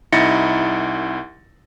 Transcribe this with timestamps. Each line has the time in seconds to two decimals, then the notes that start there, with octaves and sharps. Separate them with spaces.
0.12 C2 D#4 E4 A6 A#6 C#7